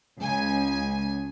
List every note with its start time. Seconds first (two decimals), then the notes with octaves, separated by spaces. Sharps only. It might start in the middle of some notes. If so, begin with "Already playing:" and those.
0.19 C#2 G#5